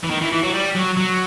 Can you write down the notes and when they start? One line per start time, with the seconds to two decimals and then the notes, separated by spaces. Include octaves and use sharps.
0.04 E3
0.10 D#3
0.21 E3
0.32 E3
0.43 F#3
0.54 G3
0.75 F#3
0.97 F#3